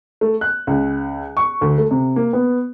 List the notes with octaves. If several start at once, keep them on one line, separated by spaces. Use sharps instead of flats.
A3
F#6
C#2
C#6
D2
A3
C3
A#3
B3